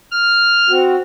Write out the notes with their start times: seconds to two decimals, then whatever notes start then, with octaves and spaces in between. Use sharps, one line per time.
0.11 F6
0.70 C4 F#4